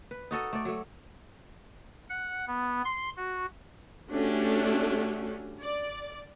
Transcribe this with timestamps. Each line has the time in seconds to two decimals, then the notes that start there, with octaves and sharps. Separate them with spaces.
0.11 B4
0.31 D#4 F#4 A4 D#5
0.53 A3 D5
0.65 F#3 A3
2.10 F#5
2.47 B3
2.85 C6
3.16 F#4
4.11 A3 C#4 D4 F#4 G4
5.62 D5